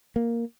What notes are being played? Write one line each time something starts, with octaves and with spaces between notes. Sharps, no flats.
A#3